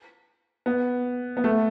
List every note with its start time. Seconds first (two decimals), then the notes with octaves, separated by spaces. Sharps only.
0.66 B3
1.37 B3
1.44 A3